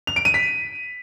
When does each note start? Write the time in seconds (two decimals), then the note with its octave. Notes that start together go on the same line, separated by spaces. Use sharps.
0.07 F7
0.16 D7
0.25 D#7
0.34 B6